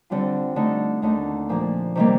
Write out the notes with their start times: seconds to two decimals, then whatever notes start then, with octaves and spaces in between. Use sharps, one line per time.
0.10 D3 G3 C4 F4
0.56 D3 A3 D#4
1.02 D#2 D3 A3 D#4
1.49 A#2 F3 A#3
1.95 C3 D#3 G3 A#3